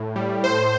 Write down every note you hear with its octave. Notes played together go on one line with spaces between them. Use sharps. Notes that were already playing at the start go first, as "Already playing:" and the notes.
Already playing: A2
G3
A2 C5